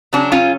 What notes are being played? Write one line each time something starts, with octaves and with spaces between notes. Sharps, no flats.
C#3 F#3 C#4 D4 F#4
C#4 F4